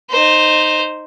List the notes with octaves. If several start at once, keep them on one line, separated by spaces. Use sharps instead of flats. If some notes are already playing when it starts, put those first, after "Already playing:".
D#4 C5